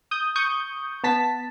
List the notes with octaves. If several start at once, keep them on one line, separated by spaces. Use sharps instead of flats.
D#6 G6
C#6 D#6 G6
B3 A5 B6